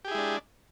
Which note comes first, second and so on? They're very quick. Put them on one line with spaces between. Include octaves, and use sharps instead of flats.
G4 G#4 E4 G#3 D4